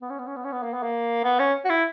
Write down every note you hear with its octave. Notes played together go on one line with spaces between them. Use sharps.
B3
C#4
B3
C#4
B3
C#4
B3
A#3
B3
A#3
B3
C#4
F#4
E4